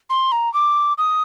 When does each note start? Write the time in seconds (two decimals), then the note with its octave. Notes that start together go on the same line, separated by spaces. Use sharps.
0.10 C6
0.32 A#5
0.54 D6
0.98 D#6